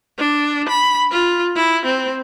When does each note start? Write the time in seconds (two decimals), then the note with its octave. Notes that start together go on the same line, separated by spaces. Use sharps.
0.19 D4
0.69 B5
1.11 F4
1.56 E4
1.85 C4